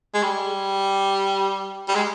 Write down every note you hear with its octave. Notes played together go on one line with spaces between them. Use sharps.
G#3
G3
G3
G#3